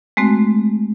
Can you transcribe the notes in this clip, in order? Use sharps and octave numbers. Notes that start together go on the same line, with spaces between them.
G#3 A3 C4 F#4